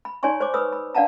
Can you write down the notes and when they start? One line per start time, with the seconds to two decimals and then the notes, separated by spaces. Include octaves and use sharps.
0.05 B5
0.23 D#4 C#5 D5 G#5 C6 C#6
0.40 C5 C#5 C#6 D6
0.54 B4 C#5 B5 D#6 E6
0.72 B5
0.95 D4 D5 F5 F#5 A5 A#5